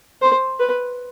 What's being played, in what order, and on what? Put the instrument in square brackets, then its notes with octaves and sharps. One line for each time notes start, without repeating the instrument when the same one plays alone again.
[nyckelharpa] C5
B4